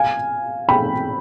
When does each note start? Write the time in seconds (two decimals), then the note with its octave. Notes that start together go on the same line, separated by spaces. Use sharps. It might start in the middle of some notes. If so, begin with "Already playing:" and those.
Already playing: F5 G#5
0.69 G5 B5